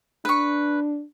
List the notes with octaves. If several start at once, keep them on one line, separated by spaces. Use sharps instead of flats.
D4 B4 C#6